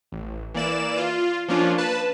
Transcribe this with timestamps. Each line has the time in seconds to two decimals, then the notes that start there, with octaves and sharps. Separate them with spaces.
0.12 A1
0.54 E3 A#3 D5 E7
0.97 F4
1.48 F3 A#3 C#4 D4 F4
1.78 B4 A5